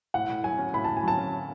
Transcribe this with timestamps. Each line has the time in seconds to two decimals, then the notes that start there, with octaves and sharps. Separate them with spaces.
0.14 A2 F#5
0.30 A2
0.43 F#3 G#5
0.58 C#4
0.73 A2 B5
0.84 A2 A5
0.97 G#5
1.03 F#3 A5
1.18 C#4